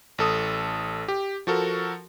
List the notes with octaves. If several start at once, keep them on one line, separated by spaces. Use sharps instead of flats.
A1 A4 D#6
G4
F3 F#4 A4 A#4